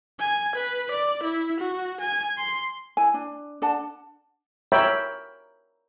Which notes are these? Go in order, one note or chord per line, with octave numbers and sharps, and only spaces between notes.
G#5
B4
D5
E4
F#4
G#5
C6
E4 G#5
D4
D4 D5 F#5 A5
A#4 C#5 E5 G5 B5